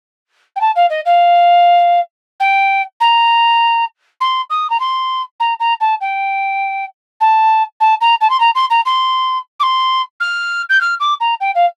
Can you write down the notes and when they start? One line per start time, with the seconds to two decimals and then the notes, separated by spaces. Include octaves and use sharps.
0.55 G5
0.60 A5
0.75 F5
0.89 D#5
1.05 F5
2.39 G5
3.00 A#5
4.20 C6
4.50 D#6
4.70 A#5
4.79 C6
5.39 A#5
5.59 A#5
5.80 A5
6.00 G5
7.20 A5
7.80 A5
8.00 A#5
8.20 A5
8.29 C6
8.40 A#5
8.55 C6
8.70 A#5
8.85 C6
9.59 D6
9.62 C6
10.20 F6
10.69 G6
10.80 F6
11.00 D6
11.20 A#5
11.40 G5
11.55 F5